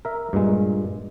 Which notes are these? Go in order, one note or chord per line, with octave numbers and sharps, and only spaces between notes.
A#4 E5
G2 A#2 G#3